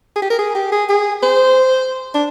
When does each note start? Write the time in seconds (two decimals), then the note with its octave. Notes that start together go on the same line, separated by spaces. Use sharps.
0.16 G#4
0.22 G4
0.30 A#4
0.39 G#4
0.55 G4
0.72 G#4
0.89 G#4
1.23 C5
2.15 D4